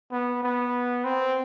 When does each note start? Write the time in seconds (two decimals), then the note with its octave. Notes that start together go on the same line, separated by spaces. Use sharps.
0.11 B3
0.43 B3
1.04 C4